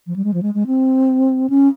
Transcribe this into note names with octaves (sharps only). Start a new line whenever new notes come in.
F3
G3
G#3
F3
G#3
G#3
C4
C#4